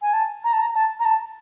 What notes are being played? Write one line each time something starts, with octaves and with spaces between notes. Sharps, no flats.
G#5
A5
A#5
A5
A#5
A5
A#5
A5